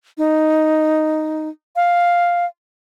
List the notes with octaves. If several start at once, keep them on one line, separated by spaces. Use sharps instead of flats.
D#4
F5